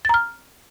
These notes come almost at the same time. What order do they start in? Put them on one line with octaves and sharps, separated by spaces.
A6 A#5 F6